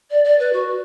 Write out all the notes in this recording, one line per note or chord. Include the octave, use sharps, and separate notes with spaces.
D5
D5
B4
F#4